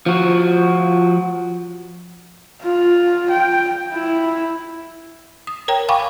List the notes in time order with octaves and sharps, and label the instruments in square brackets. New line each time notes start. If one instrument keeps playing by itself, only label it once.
[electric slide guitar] F3 F#4
[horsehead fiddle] F4
G5
E4
[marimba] D#6
A#4 C#5 G5 A#5
F5 G5 G#5 B5 C#6 D6